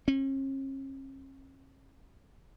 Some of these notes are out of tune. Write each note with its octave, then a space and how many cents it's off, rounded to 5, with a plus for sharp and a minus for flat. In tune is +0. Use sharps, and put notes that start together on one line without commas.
C#4 -45